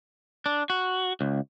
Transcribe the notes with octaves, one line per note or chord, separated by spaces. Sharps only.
D4
F#4
C#2